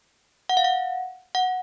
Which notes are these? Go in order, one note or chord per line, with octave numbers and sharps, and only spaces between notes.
F#5
F5
F#5
F#5